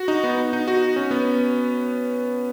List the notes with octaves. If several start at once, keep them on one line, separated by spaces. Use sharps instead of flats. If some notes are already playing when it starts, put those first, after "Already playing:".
Already playing: F#4
D#4
B3
D#4
F#4
C#4
B3